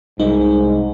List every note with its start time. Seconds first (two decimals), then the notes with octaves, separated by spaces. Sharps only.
0.20 C2 G#2 G3 D#4